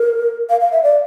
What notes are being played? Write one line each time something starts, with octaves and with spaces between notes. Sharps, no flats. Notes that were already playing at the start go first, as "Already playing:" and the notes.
Already playing: A#4
F5
F5
E5
D5